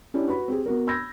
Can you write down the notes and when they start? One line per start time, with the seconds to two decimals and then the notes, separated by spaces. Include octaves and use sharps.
0.14 C#4 D4 E4 G4
0.28 F#4 B4 B5
0.48 C4 G4 G#4
0.66 B3 F#4 A#4
0.87 B5 E6 G6 G#6 A#6